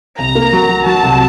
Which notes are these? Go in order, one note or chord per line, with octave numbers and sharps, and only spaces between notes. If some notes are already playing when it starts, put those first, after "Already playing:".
C2 A#5
A#3
F#3
F#3
F#3 A5
C2